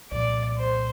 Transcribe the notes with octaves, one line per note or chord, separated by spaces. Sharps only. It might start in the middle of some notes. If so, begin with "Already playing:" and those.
C2 A#2 F3 D5
C5